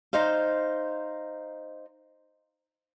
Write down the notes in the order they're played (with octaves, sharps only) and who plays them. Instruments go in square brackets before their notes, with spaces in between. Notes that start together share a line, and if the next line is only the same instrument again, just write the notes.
[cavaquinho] D#4 C5 F5